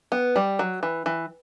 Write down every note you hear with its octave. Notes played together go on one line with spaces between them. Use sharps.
B3
G3
F#3
E3
E3